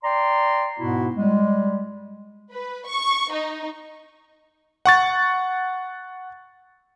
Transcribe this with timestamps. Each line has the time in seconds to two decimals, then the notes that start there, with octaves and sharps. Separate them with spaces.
0.04 D5 G5 A#5 C6
0.79 G#2 B2 B3 E4 F#4
1.16 G3 G#3
2.52 B4
2.87 C#6
3.32 D#4
4.85 F#5 C#6 A6